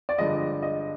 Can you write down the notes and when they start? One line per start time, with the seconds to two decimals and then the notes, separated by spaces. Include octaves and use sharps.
0.09 D5
0.18 G1 G2 F3 G#3 D#5
0.62 D#5